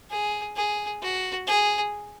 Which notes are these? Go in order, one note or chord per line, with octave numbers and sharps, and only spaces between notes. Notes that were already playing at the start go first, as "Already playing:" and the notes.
G#4
G#4
F#4
G#4